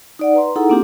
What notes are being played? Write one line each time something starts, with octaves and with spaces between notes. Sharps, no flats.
D#4 D5 F#5
B4 A#5 C6
D#4 E4 G#4 A4 F#5 A#5
A#3 C4 D4 F4 G4